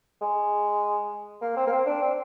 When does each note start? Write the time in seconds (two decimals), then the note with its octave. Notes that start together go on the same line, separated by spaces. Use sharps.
0.21 G#3
1.41 A#3
1.57 C4
1.67 A#3
1.72 C4
1.86 D4
2.02 C4